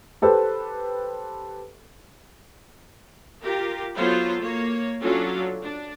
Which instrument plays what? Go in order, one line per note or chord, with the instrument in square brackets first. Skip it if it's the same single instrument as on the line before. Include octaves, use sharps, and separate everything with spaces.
[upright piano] G4 A4 B4 C5
[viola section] F4 G4 A#4
F#3 B3 F4 A4 C5 C#5
A#3 C#5
F#3 C#4 D4 F4 A4
D4